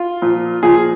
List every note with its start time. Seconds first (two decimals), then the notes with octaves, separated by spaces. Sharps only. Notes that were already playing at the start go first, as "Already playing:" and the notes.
Already playing: F4
0.22 A#2 F3
0.63 A#2 F3 G#4